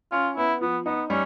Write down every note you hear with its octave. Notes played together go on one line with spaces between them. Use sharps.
C#4 F4
B3 E4
F3 B3
B3 D#4
G3 C#4